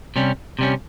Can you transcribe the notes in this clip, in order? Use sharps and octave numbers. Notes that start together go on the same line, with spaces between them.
C3 G3 C#4
C3 G3 C#4